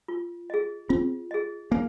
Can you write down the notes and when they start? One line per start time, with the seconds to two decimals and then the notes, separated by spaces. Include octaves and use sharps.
0.08 F4
0.50 G#4 D#5
0.89 C4 F4
1.31 G#4 D#5
1.71 A#3 D#4